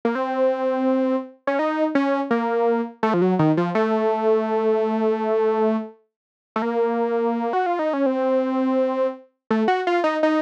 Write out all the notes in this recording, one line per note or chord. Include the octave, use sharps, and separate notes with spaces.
A#3
C4
C#4
D#4
C#4
A#3
A3
F3
F#3
D#3
F3
A3
A3
A#3
F#4
F4
D#4
C#4
C4
A3
F#4
F4
D#4
D#4